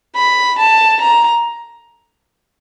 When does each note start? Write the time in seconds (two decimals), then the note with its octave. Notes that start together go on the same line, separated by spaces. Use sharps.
0.15 B5
0.58 A5
1.01 A#5